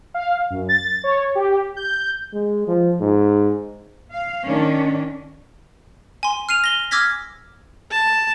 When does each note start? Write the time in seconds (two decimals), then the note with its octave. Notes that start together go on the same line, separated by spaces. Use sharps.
0.14 F5
0.50 F#2
0.69 A6
1.04 C#5
1.35 G4
1.77 G6
2.34 G#3
2.68 F3
3.00 G#2
4.13 F5
4.45 D#3 C#4 D4
6.23 G#5 C6
6.49 F6 C7 D#7 F7
6.64 A#6 G7
6.91 D6 E6 F6 G#6 A#6 B6
7.92 A5